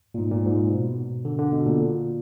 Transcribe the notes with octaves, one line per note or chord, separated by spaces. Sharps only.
A#2
G#2
A#2
G#2
B2
D3
D3
B2
A#2